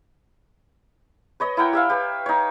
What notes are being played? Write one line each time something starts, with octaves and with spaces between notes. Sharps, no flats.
B4 C#5 D#5
E4 A#4 F#5 G5
G4 E5 F5
G4 B4
D#4 C#5